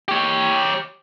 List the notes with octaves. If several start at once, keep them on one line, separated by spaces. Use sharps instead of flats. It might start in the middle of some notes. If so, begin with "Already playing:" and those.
G4 C#5